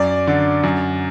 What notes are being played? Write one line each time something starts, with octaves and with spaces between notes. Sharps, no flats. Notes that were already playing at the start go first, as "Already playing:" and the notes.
Already playing: F#2 D5
D3
F#2